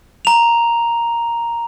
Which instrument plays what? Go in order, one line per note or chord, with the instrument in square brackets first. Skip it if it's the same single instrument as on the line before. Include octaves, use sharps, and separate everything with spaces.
[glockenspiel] A#5 F7